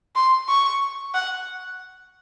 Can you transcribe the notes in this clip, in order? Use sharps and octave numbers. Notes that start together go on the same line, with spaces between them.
C6
C#6
F#5